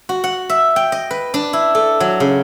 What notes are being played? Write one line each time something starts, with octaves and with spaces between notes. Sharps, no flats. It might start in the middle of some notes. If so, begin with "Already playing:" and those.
F#4
F#5
E5
G5
D#5
B4
D4
E4
A4
F#3
C#3